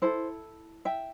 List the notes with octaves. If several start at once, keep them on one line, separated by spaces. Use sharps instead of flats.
E4 A4 C5
E5 G5